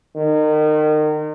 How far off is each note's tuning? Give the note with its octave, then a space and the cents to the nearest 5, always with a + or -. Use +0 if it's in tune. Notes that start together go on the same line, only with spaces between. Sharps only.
D#3 -30